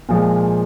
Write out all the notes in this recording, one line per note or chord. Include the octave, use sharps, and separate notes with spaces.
A#2 F3 G#3